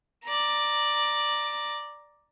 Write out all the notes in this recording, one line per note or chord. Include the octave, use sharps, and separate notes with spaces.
D5 A#5